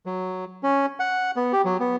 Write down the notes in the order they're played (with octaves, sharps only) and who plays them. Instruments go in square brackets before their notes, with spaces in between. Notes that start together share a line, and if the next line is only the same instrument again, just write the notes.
[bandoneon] F#3
C#4
F#5
B3
G4
F#3
B3